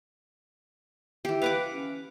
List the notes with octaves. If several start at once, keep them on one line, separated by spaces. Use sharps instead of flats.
E3 G4
B4 F5 F#5 D6
C#4